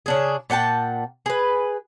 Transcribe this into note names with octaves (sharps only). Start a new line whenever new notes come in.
C#3 D4 G#4
A#2 F#5 G5 A5
G#4 B4